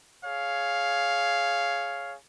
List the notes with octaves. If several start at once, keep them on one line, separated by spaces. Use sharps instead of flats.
G#4 C#5 F5